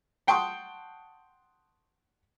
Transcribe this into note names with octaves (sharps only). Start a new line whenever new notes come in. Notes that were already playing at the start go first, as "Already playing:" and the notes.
F#5 G5 A5 C6 C#6 D#6